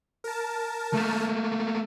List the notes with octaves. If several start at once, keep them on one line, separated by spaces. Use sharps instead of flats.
A#4 A5
A3 A#3